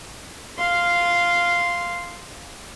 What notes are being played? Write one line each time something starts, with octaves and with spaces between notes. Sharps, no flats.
F5 C6